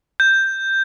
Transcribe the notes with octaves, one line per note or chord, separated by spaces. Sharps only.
G6